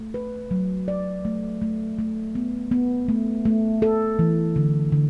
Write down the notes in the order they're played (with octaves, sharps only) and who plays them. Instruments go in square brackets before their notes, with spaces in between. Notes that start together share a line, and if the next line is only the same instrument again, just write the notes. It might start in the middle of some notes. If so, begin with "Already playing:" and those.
Already playing: [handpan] A3
B4
F#3
D5
A3
A3
A3
B3
B3
A3
A3
A4
E3
D3
D3